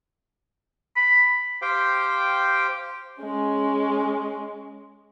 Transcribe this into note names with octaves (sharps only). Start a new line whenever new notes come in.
B5
G4 C5 F5 G5
G#3 C#4